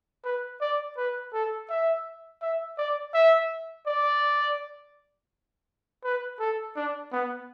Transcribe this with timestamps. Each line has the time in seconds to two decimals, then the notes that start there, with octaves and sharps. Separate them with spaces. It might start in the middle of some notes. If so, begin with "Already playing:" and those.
0.25 B4
0.61 D5
0.97 B4
1.33 A4
1.69 E5
2.42 E5
2.78 D5
3.14 E5
3.86 D5
6.04 B4
6.40 A4
6.76 D4
7.12 B3